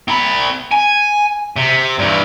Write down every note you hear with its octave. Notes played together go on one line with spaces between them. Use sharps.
C4 B5
G#5
C3
G2 E3